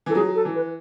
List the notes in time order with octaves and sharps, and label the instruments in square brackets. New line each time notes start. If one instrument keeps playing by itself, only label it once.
[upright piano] E3
[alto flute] A4
[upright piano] F#3 [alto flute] G#4
[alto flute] A4
[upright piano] E3
[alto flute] B4